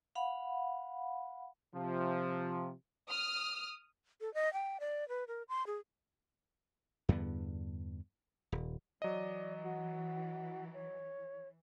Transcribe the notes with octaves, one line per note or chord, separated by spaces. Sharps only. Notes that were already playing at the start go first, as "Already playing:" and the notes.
F5 F#5 B5
C3 F3
D#6 F6
A4
D#5
G5
D5
B4
A#4
C6
G#4
E2 G2 D3 B3
D#1
E3 F#3 D5 D#5
F#4
C#5